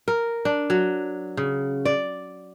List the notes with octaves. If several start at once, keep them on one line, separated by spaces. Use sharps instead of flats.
A#4
D4
F#3
C#3
D5